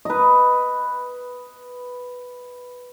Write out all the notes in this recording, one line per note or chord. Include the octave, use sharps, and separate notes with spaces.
B4 D#5